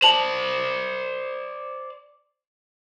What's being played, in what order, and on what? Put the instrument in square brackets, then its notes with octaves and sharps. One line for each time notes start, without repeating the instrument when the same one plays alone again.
[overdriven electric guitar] C5 D5 [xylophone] A5 F7 F#7